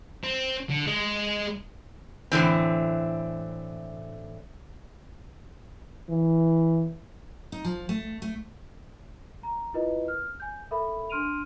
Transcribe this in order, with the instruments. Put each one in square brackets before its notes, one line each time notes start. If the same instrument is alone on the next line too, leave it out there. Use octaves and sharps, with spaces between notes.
[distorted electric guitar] C4
D3
G#3
[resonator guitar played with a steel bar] A2 D3 E3 C4
[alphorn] E3
[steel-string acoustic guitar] D#4
F3
A3
A3
[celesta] A#5
E4 F4 A#4 B4 D#5
F6
G#5 G6
A4 A#4 E5 B5
D4 C6 F6 D7 D#7 F7